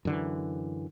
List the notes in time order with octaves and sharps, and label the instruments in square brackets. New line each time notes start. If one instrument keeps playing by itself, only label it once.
[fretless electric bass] F#2 D3 E3